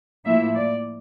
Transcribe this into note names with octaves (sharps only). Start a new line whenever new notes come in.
A2 F3 A#3 E4 E5
D5